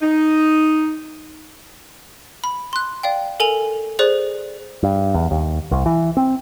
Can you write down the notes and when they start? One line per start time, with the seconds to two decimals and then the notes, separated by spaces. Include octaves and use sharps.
0.02 D#4
2.44 B5
2.73 C6 F#6
3.03 D5 F5 G5
3.40 A4 A#4 G#5 F7
3.99 G#4 C5 D5 F#6
4.83 G2
5.14 E2
5.31 D#2
5.71 C2
5.86 E3
6.17 C4